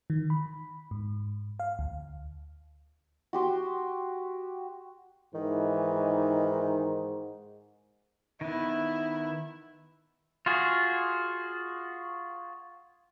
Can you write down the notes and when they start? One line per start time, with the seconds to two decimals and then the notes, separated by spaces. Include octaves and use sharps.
0.10 D#3
0.30 B5
0.91 G#2
1.60 F5
1.79 D2
3.33 F#4 G4 C6
5.35 G#2 D#3 E3
8.41 D#3 B3 E4
10.46 F4 F#4 G#4